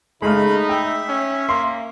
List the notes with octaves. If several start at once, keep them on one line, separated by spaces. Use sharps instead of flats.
C#3 G#3 A3 D#4 B5 F6
E5 G5
C#4
A#3 C6